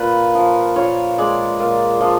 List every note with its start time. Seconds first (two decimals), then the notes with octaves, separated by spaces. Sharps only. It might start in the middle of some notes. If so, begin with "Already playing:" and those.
Already playing: A#2 B4
0.35 F3
0.76 A#2 C#5
1.18 G#3 D5
1.60 A#2
2.01 F3